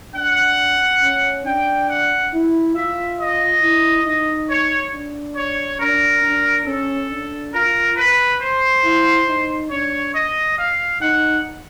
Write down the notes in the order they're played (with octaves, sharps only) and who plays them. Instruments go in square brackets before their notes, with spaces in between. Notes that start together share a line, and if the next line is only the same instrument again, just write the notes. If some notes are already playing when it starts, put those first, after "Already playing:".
[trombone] D4 [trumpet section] F#5
[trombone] C#4
[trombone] D4 [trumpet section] G5
[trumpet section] F#5
[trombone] E4
[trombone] F4 [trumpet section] E5
[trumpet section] D#5
[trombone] E4
D#4
[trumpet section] C#5
[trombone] D4
[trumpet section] C#5
[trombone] D4 [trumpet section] A#4
[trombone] D4
[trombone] C#4 [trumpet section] A4
[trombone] D4
[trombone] F4 [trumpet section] A#4
[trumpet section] B4
C5
[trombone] E4
D#4
[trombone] D4 [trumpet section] C#5
[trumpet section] D#5
F5
[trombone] D#4 [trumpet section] F#5